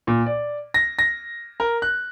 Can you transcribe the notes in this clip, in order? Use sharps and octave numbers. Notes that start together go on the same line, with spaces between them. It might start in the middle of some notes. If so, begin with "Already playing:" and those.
A#2
D5
A#6
A#6
A#4
F#6